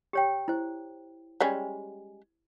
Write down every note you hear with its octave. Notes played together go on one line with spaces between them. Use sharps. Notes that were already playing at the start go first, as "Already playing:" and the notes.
G4 C#5 G5
E4 C5
G3 G#3 C#4